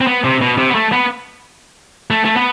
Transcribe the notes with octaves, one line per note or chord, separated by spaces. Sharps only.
C4
B3
C3
B2
C3
B3
A3
B3
A3
A3
B3